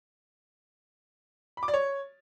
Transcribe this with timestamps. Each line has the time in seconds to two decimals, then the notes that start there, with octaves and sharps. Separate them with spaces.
1.57 B5
1.63 D6
1.68 D5
1.74 C#5